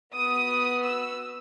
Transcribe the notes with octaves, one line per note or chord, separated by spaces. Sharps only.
B3 F#4 D#6
E6